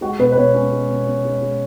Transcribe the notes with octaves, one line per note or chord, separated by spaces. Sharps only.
G#3 F#4
B2 B4
B4
B2 C#5
G#3 C#4
G#3
B2
B2
G#3
G#3